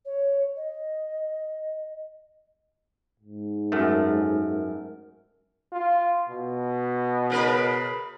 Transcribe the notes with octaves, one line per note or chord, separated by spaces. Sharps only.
C#5
D#5
G#2
F#2 A3 A#4
F4
B2
C#3 A#4 B4